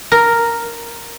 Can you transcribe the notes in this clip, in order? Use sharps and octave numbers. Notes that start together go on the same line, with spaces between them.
A#4